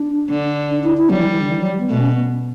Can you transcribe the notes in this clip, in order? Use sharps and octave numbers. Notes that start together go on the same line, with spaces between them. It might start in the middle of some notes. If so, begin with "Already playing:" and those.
Already playing: D4
D3
D4
E4
E4
F#3 G3
E3
E3
D3
E3
F#3
G3
B3
B2 A3
C#4
B3